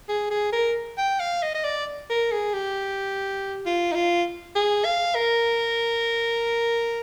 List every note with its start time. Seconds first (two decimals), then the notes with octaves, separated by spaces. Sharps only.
0.09 G#4
0.30 G#4
0.53 A#4
0.98 G5
1.20 F5
1.43 D#5
1.54 D#5
1.65 D5
2.10 A#4
2.32 G#4
2.54 G4
3.66 F4
3.92 D#4
3.96 F4
4.55 G#4
4.85 F5
5.15 A#4